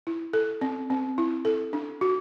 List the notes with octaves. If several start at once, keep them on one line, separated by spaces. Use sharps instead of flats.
E4
A4
C4
C4
E4
A4
D4
F#4